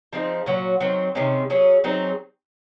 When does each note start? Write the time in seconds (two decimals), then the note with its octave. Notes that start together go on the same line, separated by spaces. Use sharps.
0.13 F3 C4 D#4 G#4
0.46 A#2 F#3 C#4 F#4
0.80 D#3 F#3 C4
1.15 C3 D#3 G#3 C#4
1.50 F#3 C#4 G#4
1.84 F#3 C4 D#4 G#4